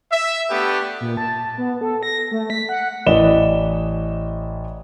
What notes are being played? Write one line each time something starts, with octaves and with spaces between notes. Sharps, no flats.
E5
A3 B3 D4 G4 B4
A#2
A5
B3
A4
A#6
A3
B6
F#5
A1 E4 D5 D#5 E7 G7